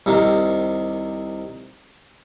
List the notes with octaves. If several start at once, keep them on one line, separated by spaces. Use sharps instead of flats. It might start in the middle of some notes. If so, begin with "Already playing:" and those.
C2 C3 D#3